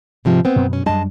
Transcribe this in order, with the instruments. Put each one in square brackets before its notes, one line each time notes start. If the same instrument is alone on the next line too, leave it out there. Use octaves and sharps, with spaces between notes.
[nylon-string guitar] G#2 C3 F3
B3 C4
[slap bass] F#2 B2
[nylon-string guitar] C#4
[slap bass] F#2 G3 D4 [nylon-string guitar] G#3 D#5 A5